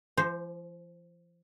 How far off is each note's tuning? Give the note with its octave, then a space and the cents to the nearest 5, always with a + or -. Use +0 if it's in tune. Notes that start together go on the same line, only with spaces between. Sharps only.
F3 -45 C5 +0